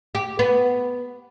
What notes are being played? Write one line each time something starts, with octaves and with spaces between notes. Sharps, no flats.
G4
B3